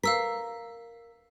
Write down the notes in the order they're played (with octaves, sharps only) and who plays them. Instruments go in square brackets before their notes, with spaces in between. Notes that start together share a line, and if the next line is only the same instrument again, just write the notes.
[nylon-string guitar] A#4 [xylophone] F5 E6 B6